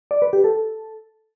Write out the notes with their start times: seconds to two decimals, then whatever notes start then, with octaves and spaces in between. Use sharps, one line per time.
0.11 D5
0.22 B4
0.33 G4
0.44 A4